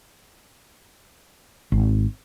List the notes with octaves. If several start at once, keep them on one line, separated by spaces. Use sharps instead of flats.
G#1